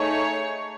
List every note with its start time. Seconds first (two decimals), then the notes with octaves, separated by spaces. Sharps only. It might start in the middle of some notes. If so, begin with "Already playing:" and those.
Already playing: A3 D#4 G#4 C#5